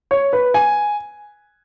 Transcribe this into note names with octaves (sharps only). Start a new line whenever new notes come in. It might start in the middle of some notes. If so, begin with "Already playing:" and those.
C#5
B4
G#5